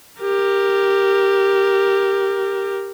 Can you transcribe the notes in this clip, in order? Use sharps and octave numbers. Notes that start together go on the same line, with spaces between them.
G4 A#4